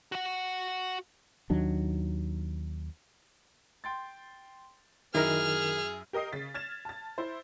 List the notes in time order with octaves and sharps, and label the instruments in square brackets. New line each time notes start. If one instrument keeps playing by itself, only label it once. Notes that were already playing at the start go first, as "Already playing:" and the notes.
[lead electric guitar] F#4 F#5
[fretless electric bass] D#2 D#3 F#3 D4
[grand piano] G5 C6 A6
[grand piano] F#2 E4 [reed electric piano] D#3 A#4 [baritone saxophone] G#4 [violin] F6
[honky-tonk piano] G4 A#4 D#5 D#6 C7
C#3 A6 B6
F6 G#6 A6 E7
A5 A6
E4 C5